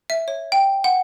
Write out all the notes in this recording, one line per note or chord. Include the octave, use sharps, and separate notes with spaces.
E5
C#5
G5
F#5